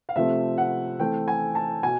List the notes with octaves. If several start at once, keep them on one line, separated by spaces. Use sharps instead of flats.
F5
C3 F3 A3 C4 E5
F#5
E3 A3 C4 G5
G#5
A5
B2 G#5